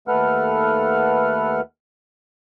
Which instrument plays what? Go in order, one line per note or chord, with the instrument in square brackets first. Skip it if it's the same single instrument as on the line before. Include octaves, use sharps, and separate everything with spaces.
[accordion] D#2 A3 A4 B4 F#5 F6